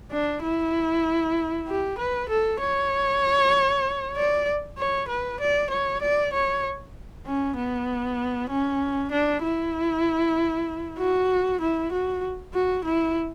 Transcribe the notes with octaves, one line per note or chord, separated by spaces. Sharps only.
D4
E4
G4
B4
A4
C#5
D5
C#5
B4
D5
C#5
D5
C#5
C#4
B3
C#4
D4
E4
F#4
E4
F#4
F#4
E4